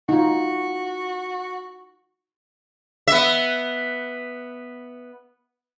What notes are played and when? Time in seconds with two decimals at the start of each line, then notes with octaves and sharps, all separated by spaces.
0.09 D#4 F4 F#4
3.08 B3 E5